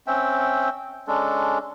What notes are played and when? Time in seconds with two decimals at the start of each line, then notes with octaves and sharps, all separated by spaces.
0.07 C4 C#4 E5 G5
1.08 G#3 C#4 D4 A4